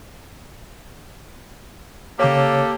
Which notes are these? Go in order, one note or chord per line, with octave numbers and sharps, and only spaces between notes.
C#3 A#3 G4 A4 C#5